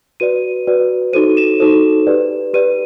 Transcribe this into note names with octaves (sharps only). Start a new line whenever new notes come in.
F#4 B4 D5 D#7
F#4 B4 D5
D#4 F#4 A4 C5 D#7
E7
D#4 F#4 A4 C5
G4 B4 D5
G4 B4 D5 D#7